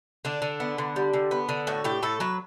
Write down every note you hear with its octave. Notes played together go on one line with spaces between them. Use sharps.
D3 D4
D3
B3
D3
G3
D3
B3
D3
A2 F#4
A2 G4
A2 A4
F#3 B4